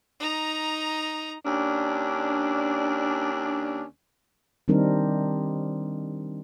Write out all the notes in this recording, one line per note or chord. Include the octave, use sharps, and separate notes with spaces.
D#4 A#5
D#2 C#4 D4
D#3 G3 C4 D4 D#4 A#4